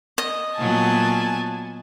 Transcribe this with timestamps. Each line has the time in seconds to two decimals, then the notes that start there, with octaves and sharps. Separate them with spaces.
0.18 D#5
0.58 A#2 F#3 B3 G#5 A5